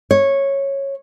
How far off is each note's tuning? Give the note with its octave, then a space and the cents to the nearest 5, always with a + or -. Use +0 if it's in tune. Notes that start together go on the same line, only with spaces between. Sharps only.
C#5 -10